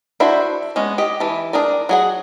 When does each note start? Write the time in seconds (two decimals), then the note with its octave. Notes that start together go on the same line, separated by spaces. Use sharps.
0.20 D4 E4 F#4 C5 E5
0.76 G#3 B3 C#4
0.98 G4 D#5
1.20 E3 A5
1.53 D4 G#4 A#4 D5
1.89 F#3 G#4 F#5